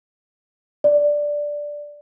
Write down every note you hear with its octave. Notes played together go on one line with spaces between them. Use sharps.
D5